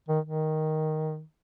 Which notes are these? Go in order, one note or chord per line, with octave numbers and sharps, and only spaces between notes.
D#3
D#3